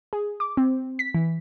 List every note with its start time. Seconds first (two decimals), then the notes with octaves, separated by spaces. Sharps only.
0.13 G#4
0.40 D6
0.57 C4
0.99 B6
1.15 E3